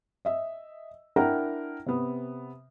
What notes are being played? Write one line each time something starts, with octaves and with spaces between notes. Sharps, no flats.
D#5 E5
D4 E4 A#4 F#5 G5 A#5
C3 B3